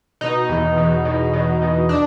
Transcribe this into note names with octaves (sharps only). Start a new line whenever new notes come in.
B2 D#4
E2
B2
B2
B2
B2
D4